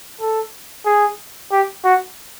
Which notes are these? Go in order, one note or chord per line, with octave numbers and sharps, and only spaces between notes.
A4
G#4
G4
F#4